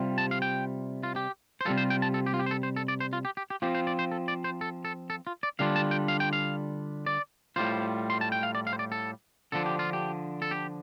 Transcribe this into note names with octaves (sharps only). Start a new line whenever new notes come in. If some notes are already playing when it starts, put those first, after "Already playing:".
Already playing: C3 G3 F4
A5
F5
G5
F4
G4
C5
C3 G3 F4 A4
C5
G5
A5
A4
G4
F4
G4
C5
A4
C5
A4
D5
C5
F4
G4
G4
G4
F3 C4 F4 G4
C5
D5
C5
A4
D5
C5
A4
A4
A4
F4
D5
D3 G3 D4 F4 F5
A5
G5
F5
G5
F5
D5
A2 G3 F4 C5
C6
A5
G5
F5
D5
F5
C5
D5
A4
D3 F3 D4 A4
G4
F4
G4
A4
G4